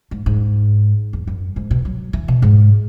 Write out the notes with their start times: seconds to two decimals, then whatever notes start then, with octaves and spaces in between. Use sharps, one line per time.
0.11 G#2
0.26 G#2
1.13 E2
1.27 F#2
1.56 G#2
1.71 B2
1.85 F#3
2.13 E3
2.28 B2
2.42 G#2